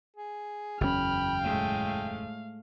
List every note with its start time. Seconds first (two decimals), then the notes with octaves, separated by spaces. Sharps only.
0.17 G#4
0.81 F#1 E2 C#4 G5 B5 F6
1.43 A2 G#3 A3 F5